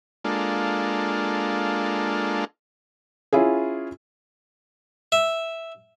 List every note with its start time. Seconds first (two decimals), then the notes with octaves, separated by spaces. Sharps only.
0.24 G#3 A#3 D4 F4 A4
3.33 C#4 E4 F4 G#4
5.12 E5